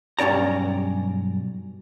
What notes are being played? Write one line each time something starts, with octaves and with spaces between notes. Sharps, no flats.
B1 G2 C#4 D5 A#5